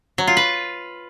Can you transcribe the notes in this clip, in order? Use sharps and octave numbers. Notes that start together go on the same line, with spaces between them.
F#3
F4
B4